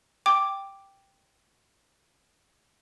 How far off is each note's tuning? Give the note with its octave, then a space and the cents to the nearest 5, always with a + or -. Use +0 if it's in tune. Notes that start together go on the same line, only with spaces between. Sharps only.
G5 +0 D6 +0